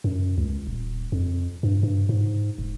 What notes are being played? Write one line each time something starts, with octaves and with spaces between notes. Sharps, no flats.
F#2
C#2
D#1
F2
G2
G2
G#2
E1